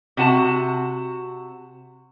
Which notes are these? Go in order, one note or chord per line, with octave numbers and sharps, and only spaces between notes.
C3 F#4 A5